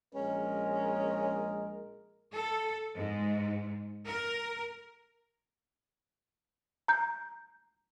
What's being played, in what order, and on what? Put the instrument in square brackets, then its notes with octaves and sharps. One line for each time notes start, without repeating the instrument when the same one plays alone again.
[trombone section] A#1 G#3 A#4 [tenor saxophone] C#4
[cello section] A4
G#2
A#4
[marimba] A#5 G6